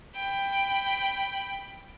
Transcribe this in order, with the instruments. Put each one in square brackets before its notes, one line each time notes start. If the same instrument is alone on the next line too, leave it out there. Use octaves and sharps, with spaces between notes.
[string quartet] G5 B5